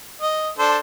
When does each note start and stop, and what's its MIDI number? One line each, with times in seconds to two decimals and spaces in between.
0.21 0.49 75
0.59 0.78 62
0.59 0.78 69
0.59 0.78 72